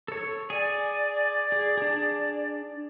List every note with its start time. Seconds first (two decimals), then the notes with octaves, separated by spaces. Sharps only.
0.08 A4 C#5
0.50 G#4 D5 G#5
1.52 G#4
1.78 D4 G#4